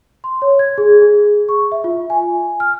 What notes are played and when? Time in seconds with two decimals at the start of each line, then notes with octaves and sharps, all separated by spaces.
0.24 C6
0.42 C#5
0.59 G#6
0.78 G#4
1.02 G#4
1.49 C#6
1.72 E5
1.84 F4
2.10 G#5
2.60 F6